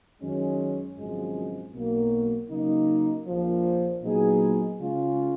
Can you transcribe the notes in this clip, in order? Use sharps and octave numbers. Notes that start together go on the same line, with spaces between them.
F#2 D#3 G#3 C#4
G#1 F#2 C#3 F3 G#3
B1 B2 F#3 A#3
C#3 F#3 A#3 D#4
A#1 A#2 F3
A#2 F#3 B3 D#4 G#4
C#3 G#3 C#4 F4